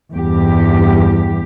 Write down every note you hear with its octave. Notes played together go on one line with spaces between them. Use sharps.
E2 G2 G4